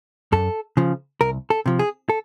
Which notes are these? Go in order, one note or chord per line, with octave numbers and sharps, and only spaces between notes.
F#2 A4
C#3 F3
C2 A#4
A4
C3 F3
G#4
A4